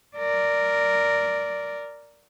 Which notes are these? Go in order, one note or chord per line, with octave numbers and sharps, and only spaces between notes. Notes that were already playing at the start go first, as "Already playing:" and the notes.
A#4 D5